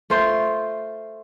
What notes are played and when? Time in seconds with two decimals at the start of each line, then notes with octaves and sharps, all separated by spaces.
0.10 A3 F4 C5